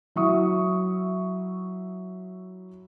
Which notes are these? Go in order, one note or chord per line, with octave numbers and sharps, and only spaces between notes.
F#3 E4 E5 C#6 D#6